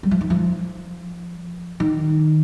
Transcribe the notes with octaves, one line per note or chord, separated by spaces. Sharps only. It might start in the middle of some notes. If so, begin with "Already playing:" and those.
G3
F3
D#3
F3
D#3